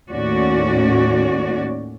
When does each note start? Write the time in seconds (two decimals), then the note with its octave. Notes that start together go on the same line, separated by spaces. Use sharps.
0.11 D#2 A2 C#4 F#4 D5